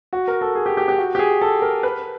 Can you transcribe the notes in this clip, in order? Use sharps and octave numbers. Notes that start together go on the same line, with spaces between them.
F#4
A#4
A4
G#4
G4
G4
G4
F#4
G4
G#4
A4
A#4
B4